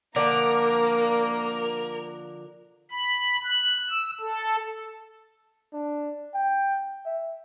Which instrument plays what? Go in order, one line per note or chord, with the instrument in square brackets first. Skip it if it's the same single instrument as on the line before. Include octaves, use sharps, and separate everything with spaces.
[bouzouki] D3 F3 D5 [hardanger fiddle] A#3 A#5 [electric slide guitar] A#4
[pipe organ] B5
F#6
E6
A4
[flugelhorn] D4
G5
E5